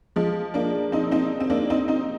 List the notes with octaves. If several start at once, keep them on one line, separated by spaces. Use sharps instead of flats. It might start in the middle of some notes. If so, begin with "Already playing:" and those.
F3 G#3
A#3 D4
C4 D#4
C4 D#4
C4
A#3 D4
C4 D#4
C4 D#4